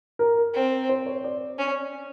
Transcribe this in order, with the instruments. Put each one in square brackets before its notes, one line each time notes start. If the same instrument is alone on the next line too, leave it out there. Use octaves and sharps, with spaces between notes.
[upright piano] A#4
[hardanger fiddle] C4
[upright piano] C5
C#5
D5
[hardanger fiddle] C#4